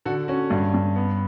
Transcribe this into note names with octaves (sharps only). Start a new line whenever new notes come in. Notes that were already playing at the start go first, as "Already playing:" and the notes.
D3 F#4 A4
C#4 F#4
G2
G2
B3